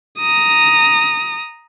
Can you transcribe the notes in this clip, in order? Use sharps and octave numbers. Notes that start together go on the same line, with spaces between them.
A#5 D#6